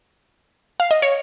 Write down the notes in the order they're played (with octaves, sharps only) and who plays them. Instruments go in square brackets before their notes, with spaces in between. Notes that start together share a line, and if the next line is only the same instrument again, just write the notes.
[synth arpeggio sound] F5
D#5
C#5